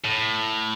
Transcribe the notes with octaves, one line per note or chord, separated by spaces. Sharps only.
A2